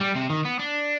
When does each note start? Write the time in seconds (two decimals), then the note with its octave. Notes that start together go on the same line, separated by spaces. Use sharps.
0.01 G3
0.16 C3
0.30 D#3
0.45 B3
0.59 D4